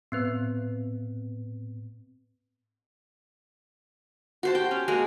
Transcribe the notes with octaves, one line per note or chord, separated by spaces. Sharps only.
A2 B3 C4 B4
F#4 C5 A5
G4 G5
C#4
G#3 A#3 F#4